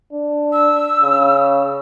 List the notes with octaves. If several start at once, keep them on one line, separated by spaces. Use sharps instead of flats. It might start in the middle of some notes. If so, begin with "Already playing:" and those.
D4
E6
C#3